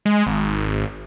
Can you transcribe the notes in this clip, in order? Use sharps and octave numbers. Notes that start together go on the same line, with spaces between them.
G#3
G#1